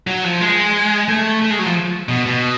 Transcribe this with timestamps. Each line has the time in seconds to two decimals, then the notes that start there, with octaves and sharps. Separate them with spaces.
0.07 F#3
0.24 F3
0.41 G#3
1.09 A3
1.42 A3
1.50 G#3
1.59 F#3
1.66 F3
2.09 B2
2.26 B2